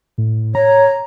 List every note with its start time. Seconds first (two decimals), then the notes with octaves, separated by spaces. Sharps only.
0.18 A2
0.55 C#5 A#5